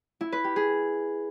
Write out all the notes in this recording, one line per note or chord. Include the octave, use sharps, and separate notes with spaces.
E4
B4
G4
G#4